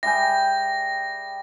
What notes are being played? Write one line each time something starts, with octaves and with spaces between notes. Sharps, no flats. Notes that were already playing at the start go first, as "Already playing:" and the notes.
G3 G#4 E5 G5 G#5 A#6